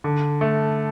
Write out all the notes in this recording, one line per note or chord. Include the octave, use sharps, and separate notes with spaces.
D3
A3